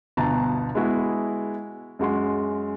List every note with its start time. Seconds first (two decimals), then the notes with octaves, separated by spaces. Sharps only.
0.17 G1 D2 B2 A5 A#5
0.75 G#3 B3 E4 F#4 G#4
1.99 F#2 G#3 F#4 C6